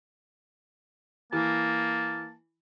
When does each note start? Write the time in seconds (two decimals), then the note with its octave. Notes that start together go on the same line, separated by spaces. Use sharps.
1.33 E3 A#3 A5